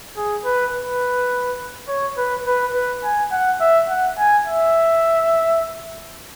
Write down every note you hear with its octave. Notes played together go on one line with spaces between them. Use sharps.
G#4
B4
B4
C#5
B4
B4
B4
G#5
F#5
E5
F#5
G#5
E5